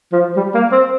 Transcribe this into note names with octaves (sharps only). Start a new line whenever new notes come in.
F3
G3
A#3
C4